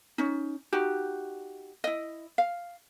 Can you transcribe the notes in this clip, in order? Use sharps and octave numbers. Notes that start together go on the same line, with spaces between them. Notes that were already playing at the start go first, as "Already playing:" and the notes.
C#4 D#4
D#4 F#4 G4
E4 D#5
F5